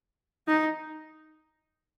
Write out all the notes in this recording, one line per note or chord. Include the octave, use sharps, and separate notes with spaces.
D#4